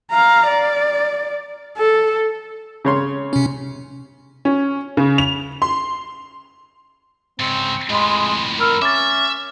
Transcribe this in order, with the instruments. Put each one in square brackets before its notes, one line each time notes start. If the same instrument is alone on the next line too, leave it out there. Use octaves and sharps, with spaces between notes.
[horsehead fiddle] F5 A#5
D5
A4
[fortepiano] C#3 C#5 C6
[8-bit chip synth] C3 C#4
[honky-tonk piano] C#4
C#3
F7
C6
[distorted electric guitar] G#2 C#3 [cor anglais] C4
[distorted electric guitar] F2 A2 [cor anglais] G#3 [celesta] D#5 B5 C6
[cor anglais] A#4 [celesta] B5 E6 F6
[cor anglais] C#4 [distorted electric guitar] E5 [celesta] D6 A6